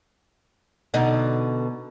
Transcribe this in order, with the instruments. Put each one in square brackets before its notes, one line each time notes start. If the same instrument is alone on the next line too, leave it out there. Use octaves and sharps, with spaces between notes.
[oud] B2 D3 D#4